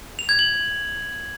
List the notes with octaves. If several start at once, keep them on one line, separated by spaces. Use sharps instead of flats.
F7
G#6
F#7